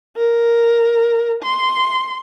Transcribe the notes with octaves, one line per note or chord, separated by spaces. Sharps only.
A#4
C6